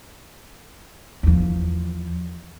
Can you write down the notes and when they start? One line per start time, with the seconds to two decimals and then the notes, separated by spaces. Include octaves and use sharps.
1.23 E2 F3